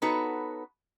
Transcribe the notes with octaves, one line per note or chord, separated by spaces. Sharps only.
B3 D#4 F#4 A4 B4 C#5